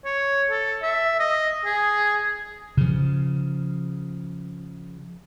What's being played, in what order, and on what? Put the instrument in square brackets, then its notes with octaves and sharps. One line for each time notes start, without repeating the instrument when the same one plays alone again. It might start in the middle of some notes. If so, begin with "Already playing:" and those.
[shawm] C#5
A4
E5
D#5
G#4
[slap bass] C#3 F3